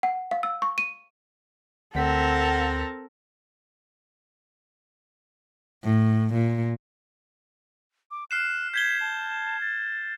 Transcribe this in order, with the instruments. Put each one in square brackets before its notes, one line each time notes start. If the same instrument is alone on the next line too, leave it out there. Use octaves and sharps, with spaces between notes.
[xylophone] F#5
F5
E6
C#6
D#7
[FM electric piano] D2 B6 [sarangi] C4 [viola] A4 A#4 [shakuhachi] F#5
[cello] A2
A#2
[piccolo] D6
[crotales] F6 C7 E7 [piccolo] F#6
[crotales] G6 G#6 G7 [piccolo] B6
[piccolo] A5
A6